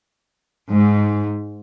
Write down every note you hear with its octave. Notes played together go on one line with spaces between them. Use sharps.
G#2